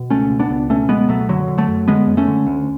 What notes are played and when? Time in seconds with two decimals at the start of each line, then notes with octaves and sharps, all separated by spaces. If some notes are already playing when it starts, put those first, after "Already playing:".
Already playing: B2
0.10 C#2 A3 C#4
0.31 B2
0.40 B3 D4
0.50 C#2
0.69 B2 A3 C#4
0.89 C#2 G#3 B3
1.09 B2 F#3 A3
1.29 F#2 D3 F#3
1.48 D3
1.58 F#3 A3
1.68 F#2
1.88 D3 G#3 B3
2.07 F#2
2.17 A3 C#4
2.27 D3
2.47 D2